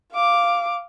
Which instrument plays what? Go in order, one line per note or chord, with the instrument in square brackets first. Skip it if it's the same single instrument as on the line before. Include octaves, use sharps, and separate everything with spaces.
[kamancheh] F5 D6